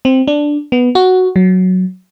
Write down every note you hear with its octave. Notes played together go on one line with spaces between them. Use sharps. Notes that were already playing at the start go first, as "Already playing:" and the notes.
C4
D4
B3
F#4
F#3